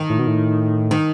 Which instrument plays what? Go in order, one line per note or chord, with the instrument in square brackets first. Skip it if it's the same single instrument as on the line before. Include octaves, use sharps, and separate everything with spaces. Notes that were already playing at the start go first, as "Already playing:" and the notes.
Already playing: [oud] D#3
[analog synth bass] A2
B2
A2
[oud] D#3